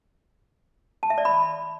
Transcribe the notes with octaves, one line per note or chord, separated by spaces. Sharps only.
A5
E5
D5
B5